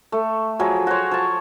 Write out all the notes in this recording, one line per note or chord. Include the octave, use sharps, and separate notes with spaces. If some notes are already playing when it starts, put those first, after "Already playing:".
A3
F3 F#3 G#4
F#4 C5 C#5
F3 A5